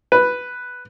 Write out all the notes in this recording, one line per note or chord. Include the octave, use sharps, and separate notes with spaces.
B4